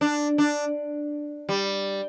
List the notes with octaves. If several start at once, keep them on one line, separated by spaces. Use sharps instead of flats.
D4
D4
G3